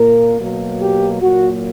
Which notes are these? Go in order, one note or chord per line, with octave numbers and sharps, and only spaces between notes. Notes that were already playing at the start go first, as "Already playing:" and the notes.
Already playing: A#2 A#3 A#4
B2 F#3 A#3
G4
A#2 F#3 A#3 F#4